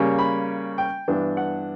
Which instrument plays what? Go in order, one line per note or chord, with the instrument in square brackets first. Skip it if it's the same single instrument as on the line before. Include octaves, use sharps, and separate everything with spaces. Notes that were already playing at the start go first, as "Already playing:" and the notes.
Already playing: [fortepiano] C#3 G3 A#3 C#4
B5
G5
G2 E3 B3 D4
F#5